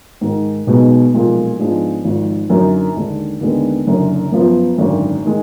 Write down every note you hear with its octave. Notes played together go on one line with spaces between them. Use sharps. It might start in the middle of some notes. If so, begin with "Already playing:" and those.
G#2 D#3 G#3
B1 B2 G#3 B3 D#4
B1 A#2 F3 G#3
G#2 F3 G#3 B3 D4
G#1 G#2 F3 G#3
F#2 D3 F#3 A#3 D#4
D#2 D3 G#3 D4
D#2 D3 G#3 B3
F#1 F#2 D3
F#2 F3 B3
G#1 F#2 D3
D#3 G#3